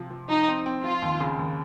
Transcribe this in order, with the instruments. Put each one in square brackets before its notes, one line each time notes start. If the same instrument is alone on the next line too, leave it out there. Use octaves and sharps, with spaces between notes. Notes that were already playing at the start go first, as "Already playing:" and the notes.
Already playing: [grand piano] C3 F3
F3
[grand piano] F3 [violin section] D#4
[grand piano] C4
C4
[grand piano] F3 [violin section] F4
[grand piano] D#2
C#3
D#2